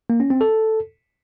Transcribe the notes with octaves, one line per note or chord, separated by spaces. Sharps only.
A#3
C#4
C4
A4